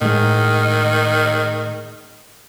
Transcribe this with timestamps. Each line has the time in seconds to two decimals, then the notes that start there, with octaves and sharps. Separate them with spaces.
0.01 A2 D#3 G#3